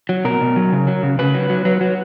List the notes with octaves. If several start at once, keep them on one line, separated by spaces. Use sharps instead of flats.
F#3
B2 A#4
B2
F#3
C#3
F#3
C#3
C#3 B4
F#3
F#3
F#3
F#3